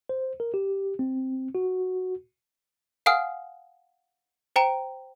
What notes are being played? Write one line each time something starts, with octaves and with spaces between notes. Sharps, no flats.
C5
A#4
G4
C4
F#4
F5 F#5 G#5 D#6 F6
C5 G5 A#5 D7